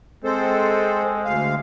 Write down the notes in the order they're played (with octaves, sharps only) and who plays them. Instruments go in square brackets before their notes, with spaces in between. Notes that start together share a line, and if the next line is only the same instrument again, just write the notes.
[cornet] G#3 [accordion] C4 A4 C5
[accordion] D2 F5